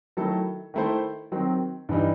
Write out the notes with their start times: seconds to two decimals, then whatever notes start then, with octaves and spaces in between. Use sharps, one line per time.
0.17 D#3 F#3 A3 E4 A4
0.74 D#3 A3 E4 A4 C5
1.32 D#3 F#3 C4
1.89 G2 E3 G3 D#4